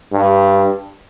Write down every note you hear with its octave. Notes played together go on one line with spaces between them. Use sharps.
G2